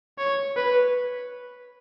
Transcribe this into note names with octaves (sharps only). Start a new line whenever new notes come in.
C#5
B4